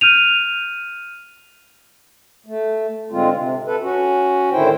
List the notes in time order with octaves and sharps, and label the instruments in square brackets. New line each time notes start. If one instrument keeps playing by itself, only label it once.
[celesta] F6 G6 D#7 F7
[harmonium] A3
G#2 D3 G#3 C4 F4
C3
A4 B4
C#4 F#4
A2 D3 D#3 E4 C5 G5